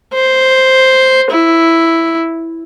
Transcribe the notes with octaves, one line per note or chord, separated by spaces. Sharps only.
C5
E4